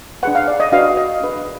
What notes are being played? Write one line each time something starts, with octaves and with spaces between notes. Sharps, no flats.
D4 G#4 B4 F#5
F5
D5
D#5
D4 F#4 B4 F5
D#5
D4 G#4 B4